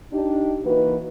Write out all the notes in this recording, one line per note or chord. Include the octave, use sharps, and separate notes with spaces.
D4 D#4 G4
E3 A#3 D#4 F#4 B4